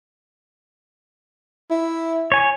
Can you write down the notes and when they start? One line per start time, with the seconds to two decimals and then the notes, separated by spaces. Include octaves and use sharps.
1.70 E4
2.32 C#5 G#5